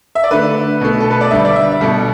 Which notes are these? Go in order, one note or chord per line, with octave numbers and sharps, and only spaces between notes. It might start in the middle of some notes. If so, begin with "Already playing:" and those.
E5
D5
D3 A3 B4
B2 A3
A4
B4
D5
D3 G3 E5
D5
E5
B2 G3 A4